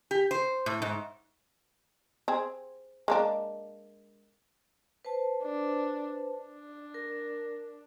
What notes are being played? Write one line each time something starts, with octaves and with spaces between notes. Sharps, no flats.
G4
C5
A2
G#2
C4 G#4
G#3 A#3 D4
B4 C5 A5
D4
D4
A#4